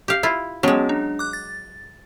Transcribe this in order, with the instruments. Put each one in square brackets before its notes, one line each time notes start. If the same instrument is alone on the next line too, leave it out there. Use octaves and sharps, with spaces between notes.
[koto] G4 F5
E4 F4
[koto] F#3 G#3 [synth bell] B3 C#4 F#4
[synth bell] D4
D6 F#6
A6